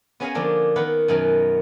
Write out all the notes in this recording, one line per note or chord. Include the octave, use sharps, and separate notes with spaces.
B3 C#4 G#4 C#5 D#5 F5
D3 F3 A#3 D4
D#3 B3 B4 F#5
F#2 B2 D#3 F#3